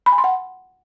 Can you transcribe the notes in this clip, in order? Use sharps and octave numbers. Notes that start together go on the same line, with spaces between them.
B5
G#5
C6
F#5